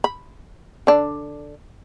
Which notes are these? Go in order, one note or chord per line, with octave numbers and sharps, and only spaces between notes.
B5
D3 D4